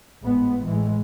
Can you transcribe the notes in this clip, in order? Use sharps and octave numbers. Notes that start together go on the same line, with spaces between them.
G#1 A2 G#3 B3
A2 E3 G#3